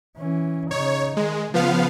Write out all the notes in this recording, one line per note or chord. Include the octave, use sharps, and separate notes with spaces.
E3 C#4
C#3 D#4 C#5
D#3 G#3
C#3 F3 B3 F5